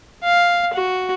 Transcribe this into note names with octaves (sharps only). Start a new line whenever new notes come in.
F5
F#4